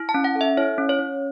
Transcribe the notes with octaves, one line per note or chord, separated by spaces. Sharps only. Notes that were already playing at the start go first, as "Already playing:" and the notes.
Already playing: E4
A5
C#4
F#5
A4
E5
E4 C#5
C#4
C#5
C#4